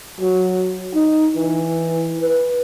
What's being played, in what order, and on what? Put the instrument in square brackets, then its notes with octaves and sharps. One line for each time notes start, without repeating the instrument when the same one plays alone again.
[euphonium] F#3
D#4
E3
B4